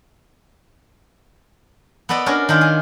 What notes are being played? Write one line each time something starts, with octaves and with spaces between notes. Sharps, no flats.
B3 A4 B4 D5 D#5
C#4 D4 F#4 A#4
D#3 D4 D#4 F4
G#4